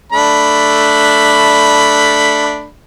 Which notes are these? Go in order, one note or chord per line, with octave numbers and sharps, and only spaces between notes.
A3 D4 B5